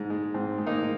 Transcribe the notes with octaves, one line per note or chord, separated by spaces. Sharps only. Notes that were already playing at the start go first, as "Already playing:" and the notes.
Already playing: G#2 G#3
G#3
G#2 C4
G#3
A#3 D#4
D#4